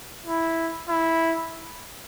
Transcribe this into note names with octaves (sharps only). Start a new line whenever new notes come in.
E4
E4